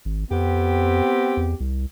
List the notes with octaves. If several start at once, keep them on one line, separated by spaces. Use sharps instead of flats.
G#1
F2 B3 C4 G4
E2
C2